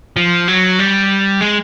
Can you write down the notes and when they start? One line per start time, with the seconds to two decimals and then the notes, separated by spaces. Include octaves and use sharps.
0.16 F3
0.48 F#3
0.79 G3
1.41 G#3